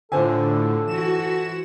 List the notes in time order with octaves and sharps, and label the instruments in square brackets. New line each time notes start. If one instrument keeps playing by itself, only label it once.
[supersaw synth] A2 D3 [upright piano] F4 C5 G#5 [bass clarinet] A4
[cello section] E3 F#4 [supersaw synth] E7